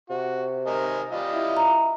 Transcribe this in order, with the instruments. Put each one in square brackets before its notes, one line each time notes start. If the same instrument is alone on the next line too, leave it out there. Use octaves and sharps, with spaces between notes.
[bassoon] C3 [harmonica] F#4
[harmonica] A#4 D#5 G#5
G3 F4 D#5
[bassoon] E4
[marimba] A#5